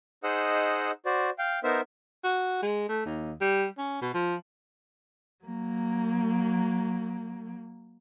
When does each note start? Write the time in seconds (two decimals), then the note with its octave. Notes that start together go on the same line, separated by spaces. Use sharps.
0.23 D#4 G#4 C5 D#5 F#5 E6
1.06 F#4 C5 D5
1.38 F5 G5
1.63 B3 D#4 A#4 C5 E5
2.24 F#4
2.62 G#3
2.89 A3
3.06 D#2
3.41 G3
3.78 C#4
4.02 B2
4.14 F3
5.44 F#3 A#3